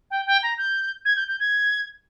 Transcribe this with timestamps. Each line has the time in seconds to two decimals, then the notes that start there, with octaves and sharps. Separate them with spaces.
0.11 G5
0.27 G5
0.43 A#5
0.58 G6
1.05 G#6
1.16 G6
1.28 G6
1.40 G#6